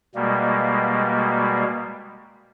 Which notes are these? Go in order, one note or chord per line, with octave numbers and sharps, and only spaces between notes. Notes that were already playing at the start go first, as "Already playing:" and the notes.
B2 G3 G#3 A#3